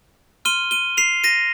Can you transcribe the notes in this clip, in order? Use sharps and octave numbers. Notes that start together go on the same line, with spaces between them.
C6 F6 D#7 G7
D#7 G7
C7 F7
A#6 D#7